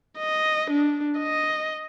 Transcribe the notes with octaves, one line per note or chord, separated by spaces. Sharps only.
D#5
D4
D#5